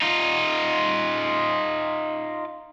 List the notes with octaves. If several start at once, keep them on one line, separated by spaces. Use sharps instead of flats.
D#4 F4